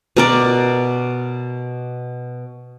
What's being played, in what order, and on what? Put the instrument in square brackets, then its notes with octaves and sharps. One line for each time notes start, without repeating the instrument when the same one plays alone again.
[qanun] B2 A#4 D5